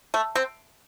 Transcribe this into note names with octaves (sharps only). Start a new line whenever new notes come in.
A3
C4